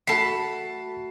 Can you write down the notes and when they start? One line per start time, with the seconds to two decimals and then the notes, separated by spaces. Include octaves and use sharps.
0.07 A3 F#4 A4 F#5 A5 B5 C7